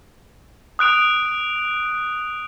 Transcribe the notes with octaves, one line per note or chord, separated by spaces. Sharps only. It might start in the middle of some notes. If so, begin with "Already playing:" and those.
D#6 F#6 D7 F7